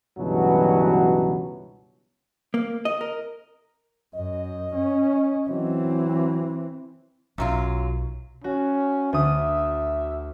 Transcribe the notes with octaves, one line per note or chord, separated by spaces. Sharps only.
C#2 G2 B2 E3 F#3 F#4
A#3
D#5
A#4
F#2 D#5
C#4
E3 F#3 C4
B1 F#2 F#3 F4
C#4 F#4
D2 E5 D#6